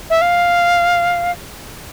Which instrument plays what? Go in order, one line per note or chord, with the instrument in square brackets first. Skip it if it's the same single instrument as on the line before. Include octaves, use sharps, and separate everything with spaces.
[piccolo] E5
F5